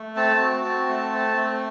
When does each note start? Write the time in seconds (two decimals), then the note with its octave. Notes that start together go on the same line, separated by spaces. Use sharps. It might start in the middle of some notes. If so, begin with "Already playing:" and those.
Already playing: A3
0.16 C4 A5
0.41 F#4
0.65 C4
0.88 A3
1.13 C4
1.36 A3